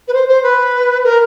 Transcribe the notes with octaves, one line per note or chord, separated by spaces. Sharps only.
B4
C5
C5
B4
A#4